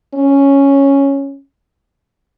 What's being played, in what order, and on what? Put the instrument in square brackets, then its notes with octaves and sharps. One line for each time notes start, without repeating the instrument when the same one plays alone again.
[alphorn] C#4